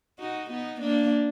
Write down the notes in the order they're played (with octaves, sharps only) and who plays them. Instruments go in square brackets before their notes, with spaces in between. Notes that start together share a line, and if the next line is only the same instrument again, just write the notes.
[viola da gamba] D#4 F#4
B3 D#4
A#3 D4